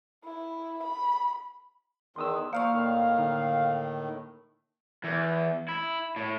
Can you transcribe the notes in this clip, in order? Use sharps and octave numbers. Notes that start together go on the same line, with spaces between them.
E4
B5
E2 D#3 C6 D#6 E6
F3 A#3 C5 D5 F5 C#6
A2 D#3
D3 D#4
E2
E4
A2